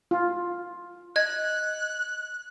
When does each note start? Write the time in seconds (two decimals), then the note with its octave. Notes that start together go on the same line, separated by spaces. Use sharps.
0.11 F4
1.16 D#5 F#6 G#6